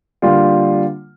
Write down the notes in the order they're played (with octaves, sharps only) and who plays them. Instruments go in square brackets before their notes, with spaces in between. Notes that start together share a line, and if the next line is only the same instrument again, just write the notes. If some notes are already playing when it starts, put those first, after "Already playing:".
[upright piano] D3 G3 A#3 F4